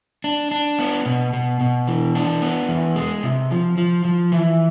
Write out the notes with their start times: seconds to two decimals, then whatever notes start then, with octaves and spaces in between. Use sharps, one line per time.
0.24 D4
0.51 D4
0.79 B3
1.06 B2
1.33 B2
1.61 B2
1.87 E3
2.15 D4
2.42 B3
2.69 E2
2.96 G#3
3.23 C3
3.51 F3
3.78 F3
4.05 F3
4.32 E3